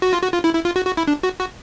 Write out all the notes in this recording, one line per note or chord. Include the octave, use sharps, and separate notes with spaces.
F#4
F4
F#4
F4
E4
E4
F4
F#4
F#4
E4
D4
F#4
F#4